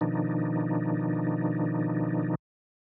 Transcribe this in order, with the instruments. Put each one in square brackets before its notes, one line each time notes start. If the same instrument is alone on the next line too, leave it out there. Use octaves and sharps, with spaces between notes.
[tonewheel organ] B2 D#3 F3 D4 D#4